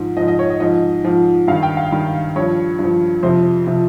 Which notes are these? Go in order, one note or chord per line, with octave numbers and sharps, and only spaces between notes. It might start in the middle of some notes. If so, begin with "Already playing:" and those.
Already playing: G#2 F3
G#2 F3 D#5
D#5
C#5
D#5
G#2 F3 D#5
G#2 F3
G2 D#3 F5
G5
F5
G2 D#3
G2 F3 C#5
G2 F3
F2 C3 F3 C5
C3 F3